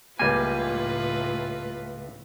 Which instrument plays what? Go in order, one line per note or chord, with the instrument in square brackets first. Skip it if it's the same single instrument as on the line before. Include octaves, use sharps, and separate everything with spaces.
[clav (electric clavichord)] C#2 G3 A#3 [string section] A2 [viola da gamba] F4 B4 [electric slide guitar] G#5